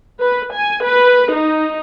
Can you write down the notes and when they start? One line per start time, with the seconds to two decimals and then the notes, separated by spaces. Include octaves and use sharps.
0.20 B4
0.53 G#5
0.84 B4
1.32 D#4